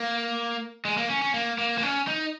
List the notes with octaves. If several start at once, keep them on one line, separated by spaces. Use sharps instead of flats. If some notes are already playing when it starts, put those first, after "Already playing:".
Already playing: A#3
G#3
A#3
C#4
C#4
A#3
A#3
A#3
C#4
D#4